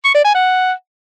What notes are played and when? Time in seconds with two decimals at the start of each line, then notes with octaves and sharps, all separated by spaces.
0.04 C#6
0.14 D5
0.24 G#5
0.34 F#5